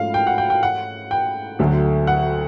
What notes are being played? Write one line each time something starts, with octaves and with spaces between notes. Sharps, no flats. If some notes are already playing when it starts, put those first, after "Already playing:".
Already playing: G#2 F3 A3 C#4 F5
G5
F#5
G5
G5
F#5
G5
D2 D3 F#3 A3
F#5